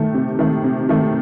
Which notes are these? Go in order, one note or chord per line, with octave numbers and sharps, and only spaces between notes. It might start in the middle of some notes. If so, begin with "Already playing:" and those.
Already playing: D#3 A3
C3
D#3 A3
C3
D#3 A3